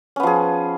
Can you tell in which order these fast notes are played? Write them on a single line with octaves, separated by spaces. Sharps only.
C#4 B3 F3 G#4